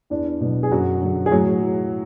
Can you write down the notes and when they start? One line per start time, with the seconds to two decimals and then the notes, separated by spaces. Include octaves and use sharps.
0.10 E2 D4
0.41 B2 F#3
0.63 G#4
0.72 F#2 F#3 F#4
1.01 D3 F#3
1.26 G#4
1.31 A2 F#3 F#4
1.61 E3